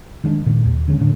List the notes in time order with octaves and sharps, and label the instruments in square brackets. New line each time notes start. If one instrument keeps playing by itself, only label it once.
[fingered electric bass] D#3 G#3 C4 D4
A#2 D#3
D#2
D3 G#3 B3 C#4
A2 D3 A3 D4